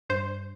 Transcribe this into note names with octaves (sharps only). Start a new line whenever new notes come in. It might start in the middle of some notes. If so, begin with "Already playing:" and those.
G2 C5